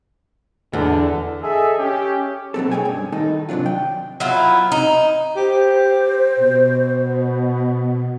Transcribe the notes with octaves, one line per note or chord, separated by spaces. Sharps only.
E2 D3
G#4 A4 D#5 E5
C#4 G4
B2 F#3 C4 A4
C#4 G#4 G5 G#5
G2
A2 D#3 D#4 A4
F#2 C3 F#3 D4 F4
G5
F#3 B3 E4 F4
D#4
G4 C5
B2